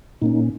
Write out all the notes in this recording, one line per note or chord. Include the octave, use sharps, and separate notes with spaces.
A#2 A#3 C#4 D#4